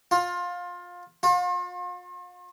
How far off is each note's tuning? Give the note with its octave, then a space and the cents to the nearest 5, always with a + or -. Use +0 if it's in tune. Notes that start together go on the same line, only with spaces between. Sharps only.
F4 +20
F4 +40